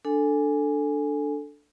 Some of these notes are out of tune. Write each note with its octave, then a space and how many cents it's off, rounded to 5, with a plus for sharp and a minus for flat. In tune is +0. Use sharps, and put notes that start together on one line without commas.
D4 +0 A4 +0 G#5 +0